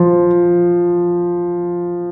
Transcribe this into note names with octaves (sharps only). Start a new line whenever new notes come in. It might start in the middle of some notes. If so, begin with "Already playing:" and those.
Already playing: F3